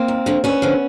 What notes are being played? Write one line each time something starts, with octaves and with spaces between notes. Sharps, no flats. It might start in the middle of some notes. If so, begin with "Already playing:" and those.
Already playing: A#3 C4
D#2
D3 F3
D2 B3 C#4
D3 F3